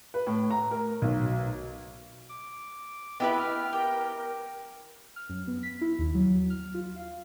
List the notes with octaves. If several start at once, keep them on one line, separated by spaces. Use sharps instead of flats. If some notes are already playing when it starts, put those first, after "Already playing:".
B4
A2
A#5
A#4
B1
D6
B3 E4 G4 B4 D#5 G5
F6
G4 A#4 G5
F6
F#2
B3
B6
E4
D#2
F#3
F6
F4
F5